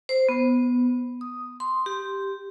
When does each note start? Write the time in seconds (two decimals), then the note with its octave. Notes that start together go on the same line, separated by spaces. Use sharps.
0.09 C5
0.29 B3
1.21 D#6
1.60 C6
1.86 G4